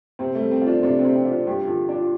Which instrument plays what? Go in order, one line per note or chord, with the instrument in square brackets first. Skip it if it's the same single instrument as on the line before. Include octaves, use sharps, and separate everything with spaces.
[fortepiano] C3 [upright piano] C4
[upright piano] A3
[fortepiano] G3
[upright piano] C4
[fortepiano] F4
[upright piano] D4
[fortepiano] C3 [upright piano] D4
[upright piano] C4
[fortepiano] C3
[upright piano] C4
[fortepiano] F4
[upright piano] D4
[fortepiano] G2 [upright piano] G4
[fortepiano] D3 [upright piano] F4
[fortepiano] D4
[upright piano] F4